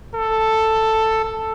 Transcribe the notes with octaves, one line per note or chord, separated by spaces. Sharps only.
A4
A4